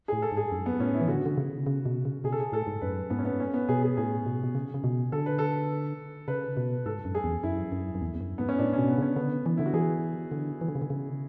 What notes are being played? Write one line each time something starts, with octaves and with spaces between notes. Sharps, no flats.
A2 G#4
A4
G#2
G#4
F#2
B3
A2 C#4
E4
E3
D3 F#4
D3
C#3
C#3
B2
C#3
B2 G#4
A4
G#4
A2 A4
G#2
F#2 B4
G#2 B3
C#4
B3
C#4
B3
B2 G#4
G#4
A2 G#4
B2
B2
C#3
C#3
B2
D3 A4
B4
A4
C#3 B4
B2
G#2 A4
F#2
G#4
E2
F#2 E4
F#2
F#2
E2
E2
F#2
G#2 B3
C#4
A2 D4
B2 C#4
B3
C#3 C#4
D3 B3
E3
D3 E4
F#4
E3 G#4
D3
E3
D3
C#3
D3
C#3